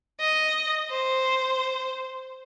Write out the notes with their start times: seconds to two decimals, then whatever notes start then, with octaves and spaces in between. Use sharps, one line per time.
0.20 D#5
0.91 C5